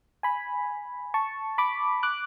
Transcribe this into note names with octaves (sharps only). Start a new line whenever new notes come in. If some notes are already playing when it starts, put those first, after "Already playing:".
G#5 B5
A5 C#6
B5 D6
D6 F#6